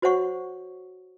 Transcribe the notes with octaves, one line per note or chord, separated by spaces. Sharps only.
F#4 C5 C#5 F#5 C#6